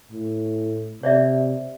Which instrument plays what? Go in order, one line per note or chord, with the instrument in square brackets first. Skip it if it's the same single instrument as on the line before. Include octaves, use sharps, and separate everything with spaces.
[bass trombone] A2
[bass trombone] C3 [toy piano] C#5 D5 E5